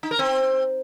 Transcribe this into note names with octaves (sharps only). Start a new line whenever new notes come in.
D#4
A#4
C4